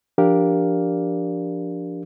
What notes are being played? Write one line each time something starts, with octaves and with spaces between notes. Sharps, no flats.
F3 D4 G4 A#4 D5 F5